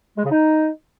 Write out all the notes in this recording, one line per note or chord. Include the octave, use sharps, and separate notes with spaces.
G#3
C#3
D#4